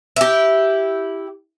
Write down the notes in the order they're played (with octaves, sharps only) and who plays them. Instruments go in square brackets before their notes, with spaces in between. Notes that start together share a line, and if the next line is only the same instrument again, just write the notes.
[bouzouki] E4 G4